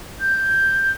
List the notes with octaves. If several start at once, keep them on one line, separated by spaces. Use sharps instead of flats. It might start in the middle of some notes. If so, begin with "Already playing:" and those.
G6